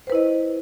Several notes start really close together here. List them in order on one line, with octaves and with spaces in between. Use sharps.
C5 B4 E4 D#5